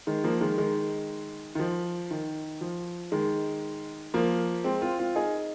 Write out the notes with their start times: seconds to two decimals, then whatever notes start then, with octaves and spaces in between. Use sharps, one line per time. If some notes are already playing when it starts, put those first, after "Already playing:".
0.07 D#3 G#3
0.24 F3 A#3
0.41 D#3 G#3
0.58 D#3 G#3
1.55 D#3
1.59 F3
2.11 D#3
2.61 F3
3.12 D#3 G#3
4.14 F3 A#3
4.64 G#3 C4
4.82 C4 F4
4.99 C4 F4
5.15 D#4 G#4